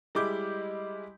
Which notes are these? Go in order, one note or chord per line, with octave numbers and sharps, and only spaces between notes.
G3 G#3 E4 D6 G6